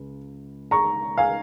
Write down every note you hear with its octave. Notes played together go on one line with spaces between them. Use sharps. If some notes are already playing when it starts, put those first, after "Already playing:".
Already playing: C#2
A#5 C#6
F5 G#5